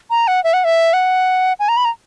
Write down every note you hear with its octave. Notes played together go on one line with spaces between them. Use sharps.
A#5
F#5
E5
F#5
E5
F#5
G#5
A#5
B5
A#5